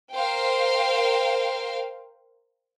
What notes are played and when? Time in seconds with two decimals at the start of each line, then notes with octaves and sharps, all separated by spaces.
0.13 A#4 C5 F5 G5